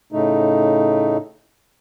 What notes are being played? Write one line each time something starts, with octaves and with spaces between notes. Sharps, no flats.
A2 C#3 A3 D#4